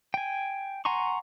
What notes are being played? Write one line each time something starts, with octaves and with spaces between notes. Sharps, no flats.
G5 G#5
F#5 G#5 A#5 C6 C#6